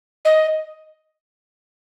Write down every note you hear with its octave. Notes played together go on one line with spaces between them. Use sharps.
D#5